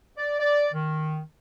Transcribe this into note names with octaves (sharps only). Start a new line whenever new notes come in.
D5
D5
D#3